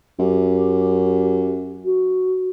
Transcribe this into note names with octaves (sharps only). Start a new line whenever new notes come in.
F#2 G4
F#4